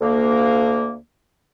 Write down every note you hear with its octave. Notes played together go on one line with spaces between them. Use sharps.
D2 A#3